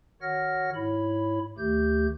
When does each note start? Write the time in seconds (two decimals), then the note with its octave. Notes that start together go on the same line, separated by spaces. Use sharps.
0.22 D#3 F#4 C#5 F#5 F6 A#6
0.75 G#2 E4 C#5 B5
1.58 D2 D#3 A3 G4 G6